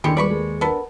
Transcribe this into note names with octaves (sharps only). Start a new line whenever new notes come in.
D#2 D3 D#3 G#3 E4 G4 C#7
G3 G#3 B4 D5 B5 C#6
G#3 A#3 A4
B3 D4 A4 A#4